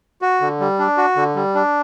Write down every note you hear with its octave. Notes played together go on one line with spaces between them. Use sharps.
F#4
D3
G3
D4
F#4
D3
G3
D4